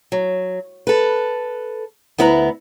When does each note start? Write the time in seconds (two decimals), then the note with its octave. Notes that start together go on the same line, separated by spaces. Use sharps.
0.12 F#3
0.87 A4 B4
2.18 D2 B3 E4 B4 A#5